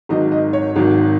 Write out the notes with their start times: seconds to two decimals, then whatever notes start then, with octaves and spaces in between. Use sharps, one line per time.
0.09 G#1 G#2 D#3 F#3 D#5
0.32 D#5
0.53 C#5
0.76 G#1 G#2 D#3 F#3